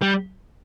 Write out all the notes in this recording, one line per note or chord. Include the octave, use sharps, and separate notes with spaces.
G3